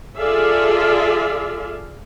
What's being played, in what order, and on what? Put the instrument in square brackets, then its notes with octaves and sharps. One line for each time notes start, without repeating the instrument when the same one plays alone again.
[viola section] F4 G#4 A4 D5 E5 F5